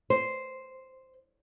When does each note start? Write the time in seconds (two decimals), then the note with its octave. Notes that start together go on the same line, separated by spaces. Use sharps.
0.10 C5